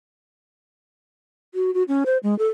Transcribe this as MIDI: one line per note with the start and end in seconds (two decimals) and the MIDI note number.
1.55 1.73 66
1.74 1.83 66
1.88 2.04 61
2.06 2.18 72
2.23 2.37 56
2.39 2.48 69